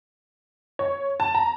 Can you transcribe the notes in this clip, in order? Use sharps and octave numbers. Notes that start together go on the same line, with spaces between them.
C#5
A5
A#5